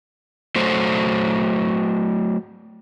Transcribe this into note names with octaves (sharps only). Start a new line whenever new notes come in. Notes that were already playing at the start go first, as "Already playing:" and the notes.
F#3 A3 A4 C5